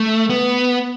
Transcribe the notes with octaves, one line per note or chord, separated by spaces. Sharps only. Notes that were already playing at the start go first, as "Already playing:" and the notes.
Already playing: A3
B3